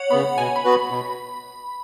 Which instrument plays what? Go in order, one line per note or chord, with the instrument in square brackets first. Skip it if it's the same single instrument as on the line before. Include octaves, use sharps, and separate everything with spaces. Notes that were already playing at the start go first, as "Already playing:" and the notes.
Already playing: [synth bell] C#5 F#5
[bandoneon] C#3 B3 [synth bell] B5
[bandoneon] B2 [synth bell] G#5
[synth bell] B5
[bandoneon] B3 F#4 B4
[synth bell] B5
[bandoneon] B2